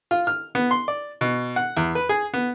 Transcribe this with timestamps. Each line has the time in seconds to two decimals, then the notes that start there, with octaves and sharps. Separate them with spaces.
0.11 F4
0.27 F6
0.55 B3
0.71 C6
0.88 D5
1.21 B2
1.56 F#5
1.77 E2
1.95 B4
2.09 G#4
2.34 B3